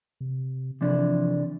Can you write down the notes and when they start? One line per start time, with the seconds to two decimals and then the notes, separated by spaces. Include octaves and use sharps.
0.21 C3
0.81 C3 E3 F3 D4